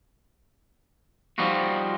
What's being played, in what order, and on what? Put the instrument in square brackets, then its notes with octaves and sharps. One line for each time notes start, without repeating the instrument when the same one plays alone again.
[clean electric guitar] F3 G3 D#4 F4 F#4